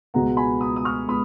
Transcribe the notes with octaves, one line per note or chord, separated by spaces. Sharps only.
C#2 B2 G#3 B3 F#5 A#5
G#5 B5
B5 D#6
D#6
C#6 F6
G#3 B3 B5 D#6